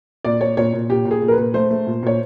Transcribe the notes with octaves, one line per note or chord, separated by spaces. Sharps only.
A#2 D5
A#2 C#5
A#2 C#5
A#2
A#2 G4
A#2
G#4
A#2
A#4
B4
A#2
A3 C5
A3
A#2
A#2 C#5